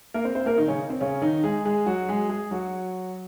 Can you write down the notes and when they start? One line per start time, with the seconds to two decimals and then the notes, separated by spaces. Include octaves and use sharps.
0.14 A#3 A#4
0.25 C4 C5
0.35 C4 C5
0.46 A#3 A#4
0.57 D#3 D#4
0.68 C#3 C#4
0.90 C4
1.01 C#3 C#4
1.21 D#3 D#4
1.44 G#3 G#4
1.65 G#3 G#4
1.86 F#3 F#4
2.09 G#3 G#4
2.29 G#3 G#4
2.51 F#3 F#4